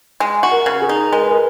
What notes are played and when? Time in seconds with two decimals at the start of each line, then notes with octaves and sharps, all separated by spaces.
0.20 G#3
0.43 F#4
0.51 A#4
0.66 C#3
0.82 G#4
0.89 D#4
1.12 G#3 A#4
1.22 B4
1.31 A#4